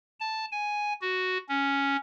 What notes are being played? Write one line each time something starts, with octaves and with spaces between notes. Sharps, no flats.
A5
G#5
F#4
C#4